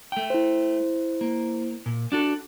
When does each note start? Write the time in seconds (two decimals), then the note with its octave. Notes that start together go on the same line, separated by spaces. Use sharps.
0.12 A3 G5
0.30 E4 C5
1.21 A#3
1.86 A#2
2.12 D4 F#4 A4